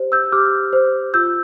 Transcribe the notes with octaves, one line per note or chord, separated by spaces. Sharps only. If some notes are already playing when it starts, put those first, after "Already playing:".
Already playing: G4 C5
E6 G6
G4 D6 F6
C5
F4 E6 G6